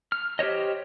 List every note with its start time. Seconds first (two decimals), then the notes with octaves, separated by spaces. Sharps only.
0.12 F6
0.39 G4 C5 C#5 D#5